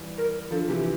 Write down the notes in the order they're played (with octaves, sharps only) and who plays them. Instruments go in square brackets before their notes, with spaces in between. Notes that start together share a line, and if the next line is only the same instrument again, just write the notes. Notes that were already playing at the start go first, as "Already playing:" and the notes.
Already playing: [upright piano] E3 G3
[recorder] A#4
[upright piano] D3 F3 [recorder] A4
[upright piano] C3 E3 [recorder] G4
[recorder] G4